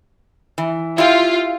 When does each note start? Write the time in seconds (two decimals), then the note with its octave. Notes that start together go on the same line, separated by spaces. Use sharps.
0.58 E3
0.98 E4 F4 G4